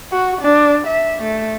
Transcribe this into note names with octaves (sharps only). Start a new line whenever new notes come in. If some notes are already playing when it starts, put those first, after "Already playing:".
F#4
D4
E5
A3